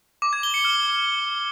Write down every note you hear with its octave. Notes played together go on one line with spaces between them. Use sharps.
D6
G#6
G7
C#7
F6